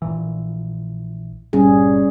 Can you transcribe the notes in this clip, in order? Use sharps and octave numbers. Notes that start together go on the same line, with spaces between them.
A#1 A#2 E3
G1 A#2 G3 C#4 G#4